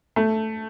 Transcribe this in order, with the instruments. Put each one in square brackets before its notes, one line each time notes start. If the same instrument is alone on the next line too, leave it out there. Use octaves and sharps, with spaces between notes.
[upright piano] A3